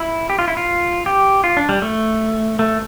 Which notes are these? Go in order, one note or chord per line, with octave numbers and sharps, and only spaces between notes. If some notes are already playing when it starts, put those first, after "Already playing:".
Already playing: E4
G4
F4
E4
F4
G4
F4
D4
G3
A3
A3